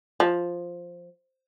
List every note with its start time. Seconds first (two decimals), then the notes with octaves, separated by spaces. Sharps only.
0.20 F3